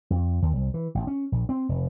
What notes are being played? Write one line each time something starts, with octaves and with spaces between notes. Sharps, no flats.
F2
D#2
C2
E3
A1
C#4
A#1
C4
F1